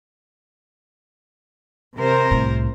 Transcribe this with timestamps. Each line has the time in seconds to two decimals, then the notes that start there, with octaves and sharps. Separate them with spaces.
1.97 C3 A#4 C5
2.31 C2 A2